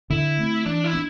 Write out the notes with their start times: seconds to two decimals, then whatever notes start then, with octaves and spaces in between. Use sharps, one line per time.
0.10 D3 E4
0.38 A3 C4
0.66 E3 D4
0.84 E4
0.93 B3 D4